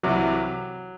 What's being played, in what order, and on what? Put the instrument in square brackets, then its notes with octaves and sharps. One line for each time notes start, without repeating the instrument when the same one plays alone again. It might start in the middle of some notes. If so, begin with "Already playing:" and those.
[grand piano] C2 C3 E3 [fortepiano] F#3